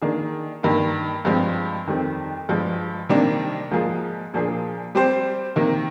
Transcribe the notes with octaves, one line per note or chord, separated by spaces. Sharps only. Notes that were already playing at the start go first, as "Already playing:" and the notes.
D#3 A#3 D4 G#4
G2 D#3 A#3
G2 F3 G#3 C4
F2 D#3 G3 C4
G2 F3 G#3
C3 D#3 G3 A#3 D4
G#2 F3 A#3 F4 G#4
A#2 F3 A#3 D4 G#4
G3 C4 G4 C5
C3 D#3 A#3